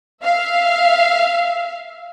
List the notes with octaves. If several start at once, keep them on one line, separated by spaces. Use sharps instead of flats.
E5 F5